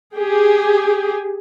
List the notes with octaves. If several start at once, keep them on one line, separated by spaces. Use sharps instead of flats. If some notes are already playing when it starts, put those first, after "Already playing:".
G4 G#4